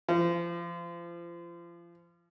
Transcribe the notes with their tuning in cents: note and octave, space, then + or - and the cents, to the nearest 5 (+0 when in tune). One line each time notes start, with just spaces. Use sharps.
F3 -30